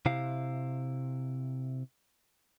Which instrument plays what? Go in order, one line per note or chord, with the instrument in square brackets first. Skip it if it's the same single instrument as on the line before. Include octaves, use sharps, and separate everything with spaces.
[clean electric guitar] C3 E4 F5